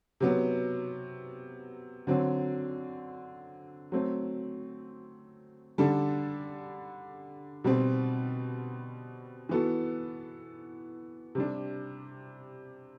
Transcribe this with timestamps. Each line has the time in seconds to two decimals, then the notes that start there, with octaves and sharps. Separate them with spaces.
0.20 C3 F#3 B3
2.07 D3 F#3 C4
3.92 F#3 A3 C4
5.78 D3 G3 D4 A4
7.64 B2 G3 C4
9.49 E3 B3 F#4 A4
11.35 C3 G3 D4